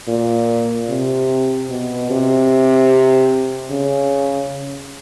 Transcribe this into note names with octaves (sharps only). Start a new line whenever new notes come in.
A#2
C3
B2
C3
C#3